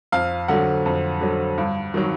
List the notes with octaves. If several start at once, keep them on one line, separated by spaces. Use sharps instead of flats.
F2 F5
D3 F#3 F#5
F2
D3 F#3
G2
D#3 F#3